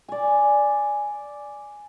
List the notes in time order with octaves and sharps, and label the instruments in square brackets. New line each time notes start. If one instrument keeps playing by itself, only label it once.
[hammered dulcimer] D5 G#5